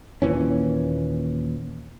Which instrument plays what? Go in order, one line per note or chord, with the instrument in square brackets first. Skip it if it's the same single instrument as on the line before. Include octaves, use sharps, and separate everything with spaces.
[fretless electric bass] D#2 A#2 E3 C#4